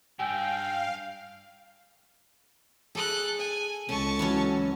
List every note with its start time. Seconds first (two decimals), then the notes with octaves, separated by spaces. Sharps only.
0.19 G2 F5 G5 G#5 E6
2.95 G#4 A4 F#6
3.38 G#5
3.89 C#2 C#4 A4 A5 C#6
4.19 E3 F#3 C#4